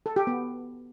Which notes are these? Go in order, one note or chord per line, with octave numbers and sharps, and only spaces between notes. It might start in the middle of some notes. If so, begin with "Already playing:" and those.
A4
G4
B3